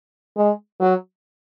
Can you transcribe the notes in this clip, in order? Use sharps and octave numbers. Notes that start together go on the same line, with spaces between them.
G#3
F#3